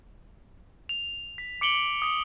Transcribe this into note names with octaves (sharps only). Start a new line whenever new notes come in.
F7
B6
D6 C#7 D7 F#7 G7
D#6 C#7